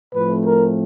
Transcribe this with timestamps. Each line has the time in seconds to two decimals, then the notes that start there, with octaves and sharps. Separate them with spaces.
0.15 A2 F3 A3 C4 B4
0.44 A#4